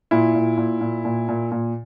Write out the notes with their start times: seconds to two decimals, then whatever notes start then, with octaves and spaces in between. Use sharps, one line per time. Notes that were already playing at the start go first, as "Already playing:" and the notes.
0.11 A#2 E4
0.35 A#2
0.57 A#2
0.81 A#2
1.05 A#2
1.28 A#2
1.52 A#2